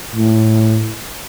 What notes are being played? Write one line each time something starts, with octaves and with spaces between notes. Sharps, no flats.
A2